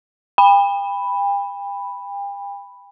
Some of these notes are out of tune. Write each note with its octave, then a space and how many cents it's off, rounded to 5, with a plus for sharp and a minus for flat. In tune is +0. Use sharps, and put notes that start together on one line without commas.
G5 +40 B5 +0